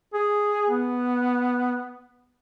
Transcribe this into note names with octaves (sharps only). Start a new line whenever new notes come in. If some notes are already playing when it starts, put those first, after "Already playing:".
G#4
B3